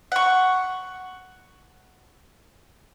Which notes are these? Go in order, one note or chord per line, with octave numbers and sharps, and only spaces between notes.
F#5 C#6